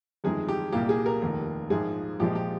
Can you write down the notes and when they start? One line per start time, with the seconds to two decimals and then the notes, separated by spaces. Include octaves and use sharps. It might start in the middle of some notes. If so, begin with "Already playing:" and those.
0.24 G1 F2 D#3 G#3 G#4
0.48 G4
0.72 C2 A#2 G3 A#3 G4
0.89 G#4
1.06 A#4
1.22 F1 D#2 D#3
1.70 A#1 G#2 F3 G#4
2.19 A#1 A#2 F3 G#3 G4
2.35 G4